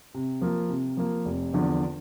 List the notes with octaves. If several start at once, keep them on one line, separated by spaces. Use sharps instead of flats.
C3
F3 A#3
C3
F3 A#3
F1
E2 D3 F3